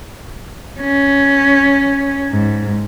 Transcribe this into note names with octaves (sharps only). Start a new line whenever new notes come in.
C#4
G#2